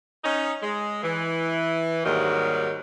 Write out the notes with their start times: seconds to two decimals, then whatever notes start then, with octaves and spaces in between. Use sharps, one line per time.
0.24 C#4 D#4
0.63 G#3
1.04 E3
2.05 D#2 G#2 D#3 F#3 G3